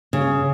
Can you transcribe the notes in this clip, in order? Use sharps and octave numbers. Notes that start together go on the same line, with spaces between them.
C#3